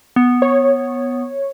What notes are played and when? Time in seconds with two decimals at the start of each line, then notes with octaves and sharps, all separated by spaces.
0.16 B3
0.42 C#5